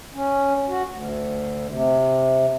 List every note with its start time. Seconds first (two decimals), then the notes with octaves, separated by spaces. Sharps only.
0.14 C#4
0.69 F#4
0.88 D2
1.68 C3